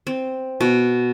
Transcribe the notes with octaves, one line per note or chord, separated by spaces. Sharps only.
C4
B2